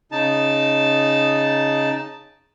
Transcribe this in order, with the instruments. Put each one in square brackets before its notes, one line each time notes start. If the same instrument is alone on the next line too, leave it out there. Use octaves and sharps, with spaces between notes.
[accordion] C#3 D#4 A5